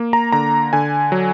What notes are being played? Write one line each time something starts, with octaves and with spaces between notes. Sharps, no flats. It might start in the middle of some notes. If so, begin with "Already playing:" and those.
Already playing: A#3
A#5
D3 A#5
D3 G#5
F#3